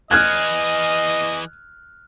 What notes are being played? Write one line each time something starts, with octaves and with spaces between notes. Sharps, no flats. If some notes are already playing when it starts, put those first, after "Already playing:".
E3 G#4 D#5 F6 F#6 G#6